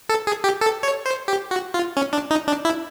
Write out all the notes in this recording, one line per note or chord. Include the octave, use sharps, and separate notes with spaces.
A4
G#4
G4
A4
C#5
C5
G4
F#4
F4
C#4
D4
D#4
D4
E4